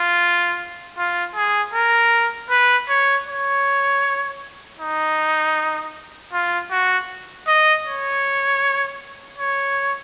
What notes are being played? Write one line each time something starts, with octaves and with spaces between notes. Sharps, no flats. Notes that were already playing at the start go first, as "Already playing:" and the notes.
Already playing: F4
F4
G#4
A#4
B4
C#5
C#5
D#4
F4
F#4
D#5
C#5
C#5